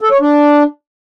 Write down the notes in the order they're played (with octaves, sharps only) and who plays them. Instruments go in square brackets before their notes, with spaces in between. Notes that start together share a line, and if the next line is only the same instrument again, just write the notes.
[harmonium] A4
C#5
D4